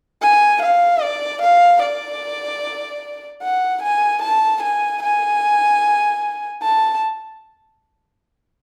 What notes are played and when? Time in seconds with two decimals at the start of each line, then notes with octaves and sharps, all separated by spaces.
0.22 G#5
0.62 F5
1.02 D5
1.42 F5
1.82 D5
3.42 F#5
3.82 G#5
4.22 A5
4.62 G#5
5.02 G#5
6.62 A5